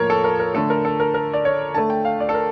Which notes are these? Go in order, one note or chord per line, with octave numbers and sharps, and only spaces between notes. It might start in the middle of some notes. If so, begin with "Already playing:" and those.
Already playing: A2 F3 A#3 A#4 C#5
A4
A#4
A#4
D3 A3 A4
A#4
A4
A#4
A#4
D5
C#5
D3 A3 A5
G5
F5
D5
A4
A#4